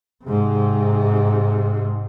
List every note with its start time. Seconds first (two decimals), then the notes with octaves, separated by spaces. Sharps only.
0.24 G#2 C3